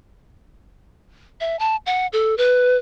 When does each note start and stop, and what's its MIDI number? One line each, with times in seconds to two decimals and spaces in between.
1.40 1.59 76
1.59 1.76 81
1.86 2.07 78
2.13 2.37 69
2.38 2.77 71